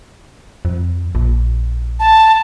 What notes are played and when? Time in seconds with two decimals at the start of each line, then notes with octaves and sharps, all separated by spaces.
0.65 F2
1.15 A#1
2.00 A5